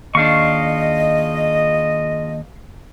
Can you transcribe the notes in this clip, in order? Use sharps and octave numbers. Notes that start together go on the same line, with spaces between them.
D#2 D4 F4 G#4 D#5 F5 C#6